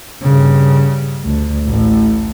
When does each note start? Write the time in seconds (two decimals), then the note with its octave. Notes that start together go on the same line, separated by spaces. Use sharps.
0.21 G2 C#3
1.24 D2
1.66 A1 A2